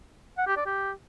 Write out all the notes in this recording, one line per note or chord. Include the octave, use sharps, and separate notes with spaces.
F#5
G4
D5
G4